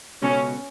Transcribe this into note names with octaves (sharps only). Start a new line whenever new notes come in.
C#2 B2 B3 C#4 A4 C#5